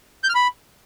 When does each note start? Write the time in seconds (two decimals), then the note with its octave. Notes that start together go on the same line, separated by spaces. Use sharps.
0.24 G6
0.29 F6
0.35 B5